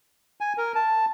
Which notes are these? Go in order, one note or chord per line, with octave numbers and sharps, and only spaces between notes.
G#5
A#4
A5